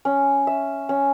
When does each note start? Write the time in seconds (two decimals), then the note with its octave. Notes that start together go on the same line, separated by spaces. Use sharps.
0.05 C#4
0.47 E5
0.89 C#4